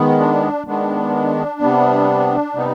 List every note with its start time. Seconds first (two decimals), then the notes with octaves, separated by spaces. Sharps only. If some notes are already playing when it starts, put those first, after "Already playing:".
Already playing: D#3 G#3 B3
0.19 D4
0.67 D#3 G#3 B3 D4
1.61 C3 G3 B3
2.55 C3 G3 B3 D#4